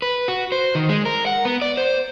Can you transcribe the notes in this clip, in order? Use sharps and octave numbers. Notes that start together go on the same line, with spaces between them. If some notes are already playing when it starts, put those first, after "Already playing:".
B4
F#4
C5
D#3
G#3
A#4
F#5
B3
D5
C5